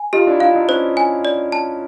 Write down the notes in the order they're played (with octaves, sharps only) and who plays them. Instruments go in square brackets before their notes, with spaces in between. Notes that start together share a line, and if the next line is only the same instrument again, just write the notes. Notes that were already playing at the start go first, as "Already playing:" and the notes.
Already playing: [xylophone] G#5
[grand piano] D#4 F4 [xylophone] G4
[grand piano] D4 E4
[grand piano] D4 E4 [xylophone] F5
[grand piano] D#4 F4
[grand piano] C#4 D#4 [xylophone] C5
[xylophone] G#5
D5
A5